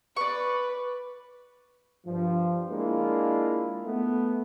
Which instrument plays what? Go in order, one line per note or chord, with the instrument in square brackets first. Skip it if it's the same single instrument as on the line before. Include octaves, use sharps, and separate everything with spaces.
[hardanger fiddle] B4 [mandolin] D5 C#6
[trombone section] G2 F3
G#3 A#3 D4 E4 F4
A3 B3